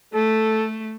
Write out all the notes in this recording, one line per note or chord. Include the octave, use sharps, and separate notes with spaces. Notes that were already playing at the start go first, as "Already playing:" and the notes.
A3 A4